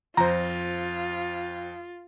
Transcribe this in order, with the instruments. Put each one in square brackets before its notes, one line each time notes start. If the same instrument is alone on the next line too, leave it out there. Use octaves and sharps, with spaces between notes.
[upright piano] F2 [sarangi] F4 [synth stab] C5 A#6 [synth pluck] A#5